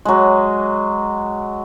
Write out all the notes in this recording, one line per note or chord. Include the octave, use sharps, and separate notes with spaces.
F#3 G#3